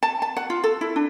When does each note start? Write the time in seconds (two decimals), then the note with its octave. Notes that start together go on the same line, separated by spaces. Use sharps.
0.03 A5
0.22 A5
0.37 F#5
0.50 F4
0.64 A4
0.81 E4
0.96 D4